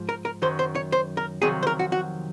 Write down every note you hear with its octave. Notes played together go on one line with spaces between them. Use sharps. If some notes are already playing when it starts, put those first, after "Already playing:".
Already playing: G#2 F3
A#4
A#4
F#2 D#3 F#3 C5
C5
C#5
C5
A#4
F2 C3 D#3 F#3 G#4
C5
A#4
F#4
F#4